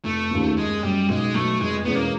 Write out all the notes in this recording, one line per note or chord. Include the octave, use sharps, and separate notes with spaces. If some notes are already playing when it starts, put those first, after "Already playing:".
F1 A3
D#2 C#3 F3
F#1 G#3
F#2 C#3 G3
B1 G#3
B2 F#3 A3
F1 G#3
E2 B2 G#3 B3 C#4
A#3